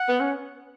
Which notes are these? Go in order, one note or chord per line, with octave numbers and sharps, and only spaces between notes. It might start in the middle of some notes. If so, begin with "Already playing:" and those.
Already playing: F#5
B3
C#4